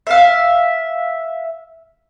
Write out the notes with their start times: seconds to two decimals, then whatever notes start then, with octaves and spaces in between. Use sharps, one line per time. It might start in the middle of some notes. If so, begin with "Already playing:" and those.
0.07 E5 F5